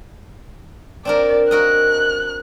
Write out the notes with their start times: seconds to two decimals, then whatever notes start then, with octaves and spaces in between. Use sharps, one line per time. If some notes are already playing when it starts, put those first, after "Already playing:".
1.05 C4 D4 A#4 D5
1.51 F#4 A#4 D#5 F#6